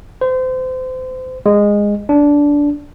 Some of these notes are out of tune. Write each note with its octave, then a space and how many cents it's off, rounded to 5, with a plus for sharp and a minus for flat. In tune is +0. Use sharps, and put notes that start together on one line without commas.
C5 -30
G#3 -15
D4 -15